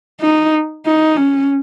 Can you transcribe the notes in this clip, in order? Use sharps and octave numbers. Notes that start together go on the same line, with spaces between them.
D#4
D#4
C#4